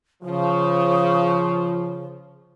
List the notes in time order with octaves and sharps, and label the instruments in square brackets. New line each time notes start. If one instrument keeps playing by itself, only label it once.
[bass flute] C#3 [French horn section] F3